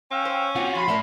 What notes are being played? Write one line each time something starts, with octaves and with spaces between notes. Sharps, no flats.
C#4 F5 G5 E6
C5
A#3 C4 F4 F#4 F#5
F3 B5 C6
A2 A4 A#4 D5 E5